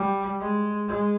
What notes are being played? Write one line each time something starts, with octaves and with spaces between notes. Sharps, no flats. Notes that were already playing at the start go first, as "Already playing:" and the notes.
Already playing: G3
G#3
G#3